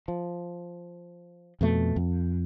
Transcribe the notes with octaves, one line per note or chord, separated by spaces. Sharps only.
F3
F2 B2 A3
F2